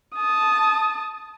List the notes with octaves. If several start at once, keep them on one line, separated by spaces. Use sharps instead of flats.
A5 D#6